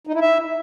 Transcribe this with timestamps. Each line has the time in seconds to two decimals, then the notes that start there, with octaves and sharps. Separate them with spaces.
0.07 D#4
0.14 E4
0.21 E5